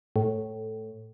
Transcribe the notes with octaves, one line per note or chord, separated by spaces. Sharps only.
A2